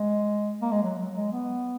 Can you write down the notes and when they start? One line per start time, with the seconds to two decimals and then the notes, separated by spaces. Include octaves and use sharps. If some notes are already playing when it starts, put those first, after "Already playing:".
Already playing: G#3
0.61 A#3
0.72 G#3
0.83 F#3
0.99 F#3
1.16 G#3
1.32 B3